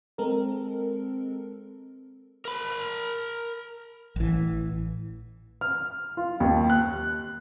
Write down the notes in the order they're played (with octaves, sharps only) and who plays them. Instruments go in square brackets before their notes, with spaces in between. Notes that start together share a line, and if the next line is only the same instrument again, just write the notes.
[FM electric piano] G#3 C4 A4 A#4
[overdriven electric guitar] A#4 B5
[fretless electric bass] A1 E3
[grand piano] F6
F4
D#2
F#6